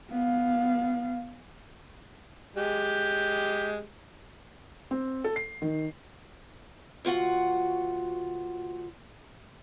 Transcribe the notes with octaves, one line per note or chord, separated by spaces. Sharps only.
B3 F5
G#3 G4
C4
A4
C7
D#3
D2 F4 F#4 F#5